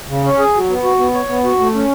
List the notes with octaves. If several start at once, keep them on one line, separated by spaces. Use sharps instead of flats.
C#3
C#4
G#4
F#3
B3
F#4
B3
C#5
B3
F#4
A3
C#4